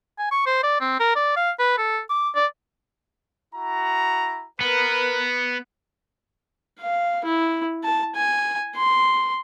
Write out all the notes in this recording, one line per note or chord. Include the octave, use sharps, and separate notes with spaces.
G#5
C#6
C5
D5
C4
A#4
D5
F5
B4
A4
D6
D5
E4 F#4 A#5
B3 A#4 B4
F5
E4
A5
G#5
C6